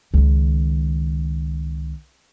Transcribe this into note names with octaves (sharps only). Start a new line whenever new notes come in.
C#2 D#3